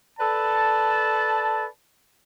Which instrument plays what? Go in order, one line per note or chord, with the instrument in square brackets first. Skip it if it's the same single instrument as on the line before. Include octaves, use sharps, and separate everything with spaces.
[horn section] A4 B4 D5 A5